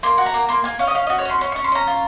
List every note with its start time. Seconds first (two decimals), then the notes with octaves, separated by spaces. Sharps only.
0.03 A#3 C6
0.18 F#4
0.26 A#5
0.34 A#3
0.49 A#3 C6
0.64 A#3 G#5
0.79 C#4 F5
0.87 D#5
0.95 C#4 F5
1.07 D#5
1.10 F#4
1.19 C#5
1.25 C#4 C6
1.41 C#4 C6
1.52 C#6
1.56 C#4
1.64 C6
1.72 C#4 A#5
1.87 F4